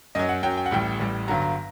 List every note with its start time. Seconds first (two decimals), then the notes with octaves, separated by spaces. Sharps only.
0.15 F#2 F#3 D#5
0.29 F#5
0.43 F#2 F#3 G5
0.57 G5
0.66 F#5
0.71 A1 A2 G3 G5
1.00 A1 A2 G3
1.28 G1 G2 D3 F#3 A#5
1.42 A#5